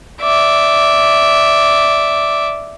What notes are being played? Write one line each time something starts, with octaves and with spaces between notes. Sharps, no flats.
D5 E5